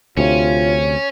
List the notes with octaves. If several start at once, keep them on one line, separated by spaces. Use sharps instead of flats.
D2 C3 C#4 F4 C#5